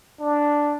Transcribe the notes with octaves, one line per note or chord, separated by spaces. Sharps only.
D4